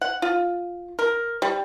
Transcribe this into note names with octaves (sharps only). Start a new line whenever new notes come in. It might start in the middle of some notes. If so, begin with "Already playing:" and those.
F#5
F4
A#4
G3